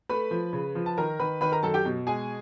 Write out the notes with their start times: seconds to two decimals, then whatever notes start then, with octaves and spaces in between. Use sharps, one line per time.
0.09 A3 B4 B5
0.31 F3
0.53 C#3
0.75 F3
0.86 A5
0.97 D#3 A#4 A#5
1.19 D#3 B4 B5
1.41 D#3 B4 B5
1.52 A#4 A#5
1.63 F#2 A4 A5
1.74 G4 G5
1.85 B2
2.07 G#3 G#4 G#5